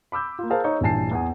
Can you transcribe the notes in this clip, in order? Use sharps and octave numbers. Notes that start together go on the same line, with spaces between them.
B5 D6 E6 G6
A#3 F4
G#4 A#4 C5 F5 A5
D#4 C#5 C#6
A#1 G2 E3 G#5 A5 C7
E2 G#5